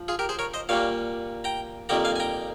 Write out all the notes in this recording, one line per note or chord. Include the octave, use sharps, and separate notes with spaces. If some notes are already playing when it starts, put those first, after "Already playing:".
Already playing: F3
F4 G#4
G4 A#4
G#4 C5
A#4 C#5
C5 D#5
A#2 G3 A#3 C#5 F5
G5 A#5
F2 D#3 G3 A#3 G5 A#5
F5 G#5
G#5
G5 A#5